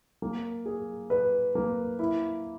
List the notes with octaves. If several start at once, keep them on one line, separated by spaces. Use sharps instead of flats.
A#3
G#4
B4
A#3
E4